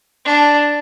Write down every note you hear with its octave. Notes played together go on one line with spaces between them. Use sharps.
D4